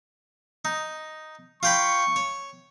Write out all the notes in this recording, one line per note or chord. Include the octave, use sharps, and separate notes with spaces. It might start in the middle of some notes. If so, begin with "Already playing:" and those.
D#4
F4 G5 B5 C#6
C#5